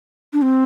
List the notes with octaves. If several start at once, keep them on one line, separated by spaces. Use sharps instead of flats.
D4
C4